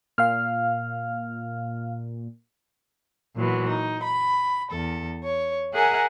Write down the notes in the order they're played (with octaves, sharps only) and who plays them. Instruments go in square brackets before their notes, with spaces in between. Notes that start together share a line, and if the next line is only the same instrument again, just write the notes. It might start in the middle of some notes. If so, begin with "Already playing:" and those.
[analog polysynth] A#2 [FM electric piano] F5 F6
[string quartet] A#2 E3 F#3 B3
D#4
B5
E2 A4
C#5
G#4 A#4 E5 F#5 G#5 A#5